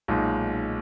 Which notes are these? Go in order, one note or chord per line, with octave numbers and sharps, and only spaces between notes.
B1 A#2 G#3 D#4